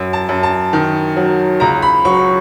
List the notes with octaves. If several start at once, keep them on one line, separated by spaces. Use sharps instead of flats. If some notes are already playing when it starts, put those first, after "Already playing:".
Already playing: F#2
A5
F#2
A5
D#3
F#3
C#2 A#5
B5
F#3 C#6